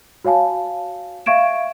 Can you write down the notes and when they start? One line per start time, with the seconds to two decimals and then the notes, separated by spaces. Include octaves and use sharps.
0.25 F#4 C#5 F5 G#5 A5
1.26 E5 F5 C#6 G#6 D7 E7